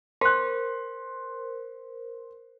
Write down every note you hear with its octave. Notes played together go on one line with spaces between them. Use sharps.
A#4 C5 C6 F#6